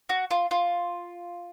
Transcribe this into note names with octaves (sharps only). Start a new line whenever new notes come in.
F#4
F4
F4